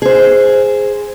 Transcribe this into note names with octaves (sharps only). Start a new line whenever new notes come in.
G#4 C5